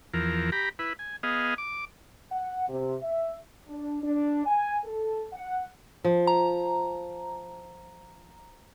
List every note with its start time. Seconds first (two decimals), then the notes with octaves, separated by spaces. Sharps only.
0.14 E2 F3 A#4
0.52 G4 A#5 B5
0.79 E4 B4
0.99 G#5
1.23 B3 G#4 D#5 F5
1.58 D6
2.32 F#5
2.69 C3
3.03 E5
3.68 D4
4.03 D4
4.46 G#5
4.85 A4
5.33 F#5
6.04 F3
6.27 A#5